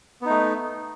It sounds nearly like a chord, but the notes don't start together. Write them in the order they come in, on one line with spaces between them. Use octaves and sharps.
B3 D#4 A3